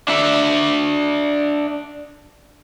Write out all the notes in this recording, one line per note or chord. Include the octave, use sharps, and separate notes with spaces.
D4 E5